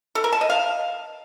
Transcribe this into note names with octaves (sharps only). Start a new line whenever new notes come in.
A4
A#4
A5
D#5
F5